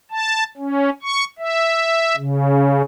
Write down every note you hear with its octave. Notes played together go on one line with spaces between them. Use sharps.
A5
C#4
C#6
E5
C#3